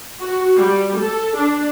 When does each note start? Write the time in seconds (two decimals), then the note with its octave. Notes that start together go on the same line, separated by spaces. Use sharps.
0.21 F#4
0.57 G3
0.99 A4
1.38 D4